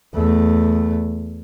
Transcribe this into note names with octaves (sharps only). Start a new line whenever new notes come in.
E2 A3